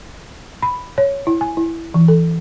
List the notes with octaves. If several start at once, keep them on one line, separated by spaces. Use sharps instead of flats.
B5
C#5
E4
G#5
E4
E3
A4